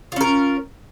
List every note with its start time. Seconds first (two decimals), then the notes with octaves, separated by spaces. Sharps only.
0.12 F4
0.16 C#4
0.21 A#4